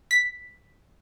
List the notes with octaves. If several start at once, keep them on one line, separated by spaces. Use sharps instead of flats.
B6